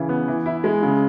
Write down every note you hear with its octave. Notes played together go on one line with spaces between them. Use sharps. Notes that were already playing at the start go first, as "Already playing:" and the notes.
Already playing: C#3 E3
B3
E3
E4
G#3
C#3